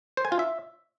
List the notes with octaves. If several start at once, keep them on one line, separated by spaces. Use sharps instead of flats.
C5
G#5
F4
E5